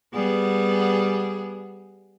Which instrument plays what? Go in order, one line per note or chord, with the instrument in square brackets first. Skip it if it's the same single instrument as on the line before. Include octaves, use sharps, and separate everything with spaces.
[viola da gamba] G3 B3 G#4